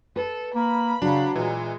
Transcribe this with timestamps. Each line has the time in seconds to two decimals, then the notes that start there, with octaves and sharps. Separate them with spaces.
0.16 A4 B4
0.55 A#3 B5
1.02 C#3 F#3 D4
1.36 A#2 E3 G#3